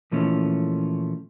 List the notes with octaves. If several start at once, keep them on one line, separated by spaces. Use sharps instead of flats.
A#2 E3 F3 A3 C#4